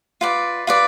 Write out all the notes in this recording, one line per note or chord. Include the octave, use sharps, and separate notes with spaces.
F4 B4 D5
F4 B4 D5